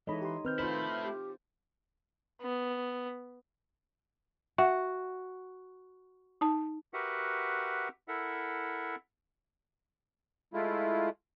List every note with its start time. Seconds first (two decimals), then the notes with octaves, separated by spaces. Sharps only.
0.07 E3 G#3 D#4 A4 C#5 D#5 B5
0.22 G4 C6
0.45 D#3 C4 B4 F6 G6
0.59 A3 E4 F4 C5
1.04 G4
2.41 B3
4.58 F#4 E5 F#5 C#6
6.41 D#4 A5
6.94 F#4 G4 A#4 B4 E5 F#5
8.08 E4 A4 A#4 E5 F#5
10.54 G#3 A3 E4 F4